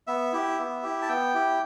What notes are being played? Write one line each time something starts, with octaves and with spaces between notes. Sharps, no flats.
B3 E5
E4 G4
B3
E4 G4
A5
B3 G5
E4 G4